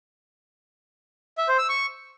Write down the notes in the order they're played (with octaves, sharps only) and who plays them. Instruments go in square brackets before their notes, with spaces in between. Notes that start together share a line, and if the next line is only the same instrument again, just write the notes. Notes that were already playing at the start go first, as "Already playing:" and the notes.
[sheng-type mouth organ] E5
C5
E6
C#6